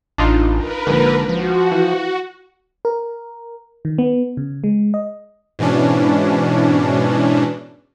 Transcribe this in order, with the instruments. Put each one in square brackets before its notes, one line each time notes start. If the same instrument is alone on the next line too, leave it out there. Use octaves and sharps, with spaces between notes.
[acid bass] A1 [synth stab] D4 D#4 F4
[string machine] A#4 B4
[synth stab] A#1 G#2 [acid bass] D3
[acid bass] F3 [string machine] F#4
[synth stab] E3
[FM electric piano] A#4
D#3
B3
C#3
G#3
D#5
[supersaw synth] G#2 B2 E3 C#4 D4